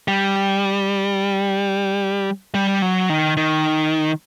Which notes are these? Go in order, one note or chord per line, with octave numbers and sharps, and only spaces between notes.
G3
G3
F#3
D#3
D#3